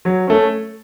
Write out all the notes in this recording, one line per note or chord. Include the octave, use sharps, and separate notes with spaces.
F#3
A3 C#4